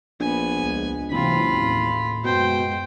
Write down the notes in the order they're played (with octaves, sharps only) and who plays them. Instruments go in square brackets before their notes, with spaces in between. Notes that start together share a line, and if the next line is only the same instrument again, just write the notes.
[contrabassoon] A#1 [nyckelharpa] B3 G#5
[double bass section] C#2 G#3
[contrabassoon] F#1 [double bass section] C3 E3 C4 [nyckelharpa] F4 B5
[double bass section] D#2 A2
[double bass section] F#2 G#3 [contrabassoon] B2 [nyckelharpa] C5 G5